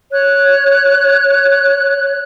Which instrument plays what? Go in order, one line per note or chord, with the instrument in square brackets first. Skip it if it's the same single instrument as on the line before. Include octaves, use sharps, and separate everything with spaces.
[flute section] C#5 F#6